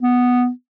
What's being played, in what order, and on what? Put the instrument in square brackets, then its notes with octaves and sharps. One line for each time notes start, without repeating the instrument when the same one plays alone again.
[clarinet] B3